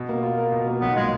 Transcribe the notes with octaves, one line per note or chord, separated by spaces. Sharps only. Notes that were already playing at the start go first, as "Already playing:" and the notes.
Already playing: B2
A#3
F4
A#4
B2
A#3
B1 B3
A#2 G#3